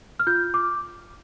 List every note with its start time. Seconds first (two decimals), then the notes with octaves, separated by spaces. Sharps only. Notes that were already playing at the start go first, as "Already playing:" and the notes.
0.20 F6
0.27 F4 G6
0.54 D6